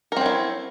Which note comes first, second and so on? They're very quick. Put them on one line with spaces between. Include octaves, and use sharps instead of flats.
A#4 C4 F#3 E4